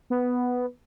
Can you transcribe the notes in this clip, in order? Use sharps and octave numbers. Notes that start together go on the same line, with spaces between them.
B3